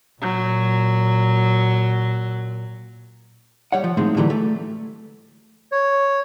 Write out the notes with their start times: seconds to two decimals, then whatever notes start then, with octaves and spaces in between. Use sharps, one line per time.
0.22 A#2 F#3
3.72 G3 C#5 F#5
3.84 F3
3.97 A2 D#3 F3 G#3 C4
4.17 D3 E3 F#3 G3 A3
4.30 A3
5.72 C#5